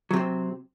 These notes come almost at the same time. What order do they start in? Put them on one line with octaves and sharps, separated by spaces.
F#3 C3 C4